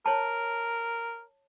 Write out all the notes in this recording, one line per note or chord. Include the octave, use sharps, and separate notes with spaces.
A#4 C#5 A5